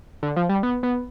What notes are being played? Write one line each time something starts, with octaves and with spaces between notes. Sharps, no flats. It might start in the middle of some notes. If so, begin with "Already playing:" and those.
D3
F3
G3
B3
B3